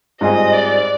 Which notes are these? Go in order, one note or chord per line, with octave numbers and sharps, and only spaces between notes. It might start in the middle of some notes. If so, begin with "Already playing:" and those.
G#2 G3 C4 F4 G#4 D#5
D5